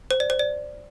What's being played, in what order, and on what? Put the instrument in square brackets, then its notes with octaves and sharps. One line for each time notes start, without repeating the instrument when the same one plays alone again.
[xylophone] C5
D5
C5
D5